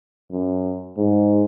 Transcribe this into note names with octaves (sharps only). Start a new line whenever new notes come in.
F#2
G#2